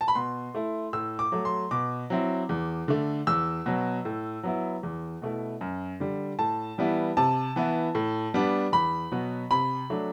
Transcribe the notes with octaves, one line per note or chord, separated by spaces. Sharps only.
A5
B5
B2 C6
A3 E4
A2 E6
D6
F#3 A3
C6
B2 D6
F#3 C4 E4
E2
D3 A3
E2 E6
B2 F#3
A2
F#3 B3 E4
E2
B2 A3 E4
F#2
D3 G3
A2 A5
E3 G3 B3 E4
C3 A5
E3 B3 E4
A2
G3 B3 D4
E2 B5
B2 F#3 B3
C3 B5
F#3 A3 D4